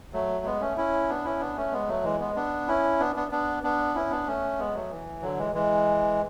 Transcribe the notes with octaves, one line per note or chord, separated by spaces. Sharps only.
F#3 A3
G#3 B3
A3 C#4
C#4 E4
B3 D4
C#4 E4
B3 D4
A3 C#4
G#3 B3
F#3 A3
E3 G#3
G#3 B3
B3 D4
C#4 E4
B3 D4
B3 D4
B3 D4
B3 D4
C#4 E4
B3 D4
A3 C#4
G#3 B3
F#3 A3
E3
D3 F#3
E3 G#3
E3 G#3